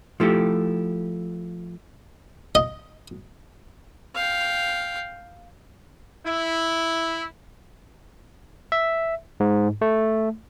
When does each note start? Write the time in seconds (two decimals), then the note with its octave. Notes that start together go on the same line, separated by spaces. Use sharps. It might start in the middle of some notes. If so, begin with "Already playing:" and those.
0.20 F3 A3 E4 G4
2.55 D#5
4.15 F5 G5
6.25 E4
8.72 E5
9.40 G#2
9.82 A3